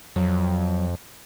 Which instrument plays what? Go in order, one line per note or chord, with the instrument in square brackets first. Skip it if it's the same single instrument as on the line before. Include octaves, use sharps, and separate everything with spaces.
[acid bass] F2 [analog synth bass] F#3